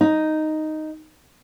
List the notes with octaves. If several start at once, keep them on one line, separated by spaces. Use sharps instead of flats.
D#4